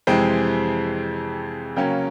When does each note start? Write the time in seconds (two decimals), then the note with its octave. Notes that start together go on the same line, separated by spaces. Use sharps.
0.07 F2 C3 E3 G#3 C4 G5
1.76 C#3 F#3 A#3 C#4 G5